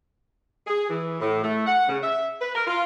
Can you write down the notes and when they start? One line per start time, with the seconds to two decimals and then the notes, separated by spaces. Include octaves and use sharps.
0.67 G#4
0.89 E3
1.20 A2
1.42 A3
1.66 F#5
1.88 C#3
2.02 E5
2.41 B4
2.55 A#4
2.67 F4